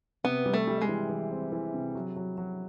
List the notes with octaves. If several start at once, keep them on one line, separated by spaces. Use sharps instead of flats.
C3 B3
G3
A3
G3
G#3
E3
E3
C4
E3
C3
F#3
F#3
F#3